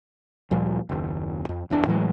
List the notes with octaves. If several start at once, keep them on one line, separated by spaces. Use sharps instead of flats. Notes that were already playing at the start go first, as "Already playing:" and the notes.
D2 A#2 F3 G3
F#1 D#2
F2
F#1 E2 E3 D4
A2 E3 F#3 G#3